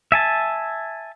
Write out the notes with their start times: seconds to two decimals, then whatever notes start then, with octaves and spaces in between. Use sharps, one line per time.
0.12 E5 G#5 A5